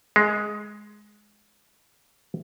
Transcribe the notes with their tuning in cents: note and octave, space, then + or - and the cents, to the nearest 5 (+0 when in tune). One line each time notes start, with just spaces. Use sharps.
G#3 +10